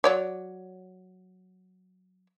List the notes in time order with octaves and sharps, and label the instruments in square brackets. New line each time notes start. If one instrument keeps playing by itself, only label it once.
[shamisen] F#3 C#5 D5